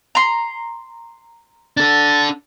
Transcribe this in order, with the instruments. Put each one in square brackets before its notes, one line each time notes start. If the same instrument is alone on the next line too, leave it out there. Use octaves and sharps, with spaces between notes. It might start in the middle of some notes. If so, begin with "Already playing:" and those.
[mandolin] A#5 C6
[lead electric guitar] D4 A4 [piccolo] A6